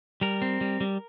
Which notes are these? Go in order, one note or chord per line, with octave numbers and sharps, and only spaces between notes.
G3 A#4
C4
G3
G3